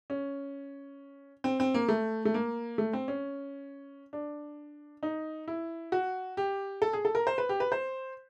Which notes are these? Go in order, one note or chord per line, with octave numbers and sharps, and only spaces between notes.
C#4
C4
C4
A#3
A3
A3
A#3
A3
C4
C#4
D4
D#4
E4
F#4
G4
A4
G#4
A4
A#4
C5
B4
G4
B4
C5